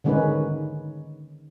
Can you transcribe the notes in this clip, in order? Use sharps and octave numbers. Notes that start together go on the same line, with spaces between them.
D3 D#3 G#3 C#4 D#4 B4